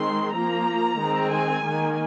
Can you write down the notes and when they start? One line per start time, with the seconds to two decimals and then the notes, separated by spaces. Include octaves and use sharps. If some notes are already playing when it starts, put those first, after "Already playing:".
Already playing: D#3 G#3 C4 C6
0.34 F3 A#3 A#5
0.98 D#3 G#3 C4
1.31 G#5
1.64 D#3 A#3